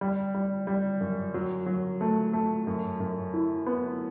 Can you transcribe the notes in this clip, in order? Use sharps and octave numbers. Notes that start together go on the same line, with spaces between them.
G3
G3
G3
F#2
F#3
F#3
A3
A3
F#2
F#2
E4
B3